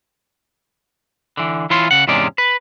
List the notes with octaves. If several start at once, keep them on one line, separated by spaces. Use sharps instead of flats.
D3 E3
E3 E4 F4 C#5 C6
C#3 F#5
E2 G#2 C3 G#3 C#4 D5
B4